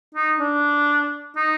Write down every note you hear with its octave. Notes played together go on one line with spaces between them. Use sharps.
D#4
D4
D#4